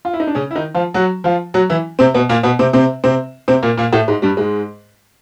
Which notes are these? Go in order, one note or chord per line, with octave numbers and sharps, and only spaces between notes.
F4
E4
D#4
D4
C#3 C#4
E4
D#3 D#4
F3 F4
F#3 F#4
F3 F4
F#3 F#4
E3 E4
C3 C4
B2 B3
A#2 A#3
B2 B3
C3 C4
C3 C4
C3 C4
C3 C4
A#2 A#3
A#2 A#3
A2 A3
G#2 G#3
G2 G3
G#2 G#3